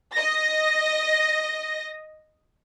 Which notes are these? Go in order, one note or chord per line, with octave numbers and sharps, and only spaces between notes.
D#5 A#6